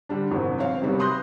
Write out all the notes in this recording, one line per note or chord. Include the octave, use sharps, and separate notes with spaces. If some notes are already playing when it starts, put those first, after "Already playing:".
D3 G3 D4
F#1 E2 G#2 C3 D#3 F#3
C4 C#5 F5
C3 D#3 F#3 G3 B3
B5 C6 D#6 F#6 G6 A#6